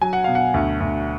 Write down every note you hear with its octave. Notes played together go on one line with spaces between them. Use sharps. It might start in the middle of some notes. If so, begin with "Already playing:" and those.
F#3 G#5
F#5
B2 F5
F#5
D2
D2